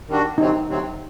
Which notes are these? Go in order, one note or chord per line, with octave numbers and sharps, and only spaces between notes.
D#3 G3 D4 F#4
D2 C3 F#3 C4 D#4
D2 C3 F#3 C4